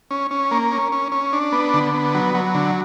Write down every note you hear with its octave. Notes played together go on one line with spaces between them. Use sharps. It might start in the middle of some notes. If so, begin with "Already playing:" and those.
C#4
C#4
A#3
C#4
C#4
C#4
D4
B3
D3
B3
F#3
F#3
D3